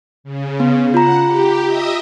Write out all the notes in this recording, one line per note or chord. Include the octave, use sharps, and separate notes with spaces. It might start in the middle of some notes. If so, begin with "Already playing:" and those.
C#3
B3
F4 F#5 A#5
G4
D#5 E5 D#6